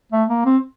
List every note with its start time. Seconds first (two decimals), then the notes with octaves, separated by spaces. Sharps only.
0.12 A3
0.29 A#3
0.45 C4